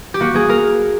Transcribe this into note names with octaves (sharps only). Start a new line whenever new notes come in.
G4
A#3 F#4
A#3 G#4
A#3 A#4